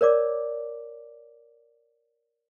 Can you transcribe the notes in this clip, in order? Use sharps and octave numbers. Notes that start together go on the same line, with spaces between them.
A#4 C#5 D5 D6